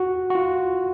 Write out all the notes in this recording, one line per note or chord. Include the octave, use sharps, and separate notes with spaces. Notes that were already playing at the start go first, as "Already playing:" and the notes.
Already playing: F#4
F#4
F4